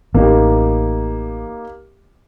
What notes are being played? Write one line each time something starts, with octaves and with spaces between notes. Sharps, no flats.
A1 A#3 D#4 G4